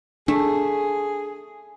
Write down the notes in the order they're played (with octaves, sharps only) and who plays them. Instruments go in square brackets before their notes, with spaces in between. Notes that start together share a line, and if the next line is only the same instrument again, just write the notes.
[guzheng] A3 [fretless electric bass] D4 [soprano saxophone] G#4